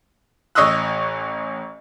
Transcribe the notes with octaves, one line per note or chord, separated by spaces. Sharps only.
A1 D#5 C#6 D#6 E6 F#6